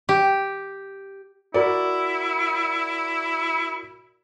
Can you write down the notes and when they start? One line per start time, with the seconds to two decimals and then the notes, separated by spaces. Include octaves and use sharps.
0.09 G4
1.54 E4 F#4 A#4 D5